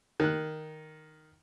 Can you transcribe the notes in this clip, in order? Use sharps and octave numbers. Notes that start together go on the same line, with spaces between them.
D#3 F#6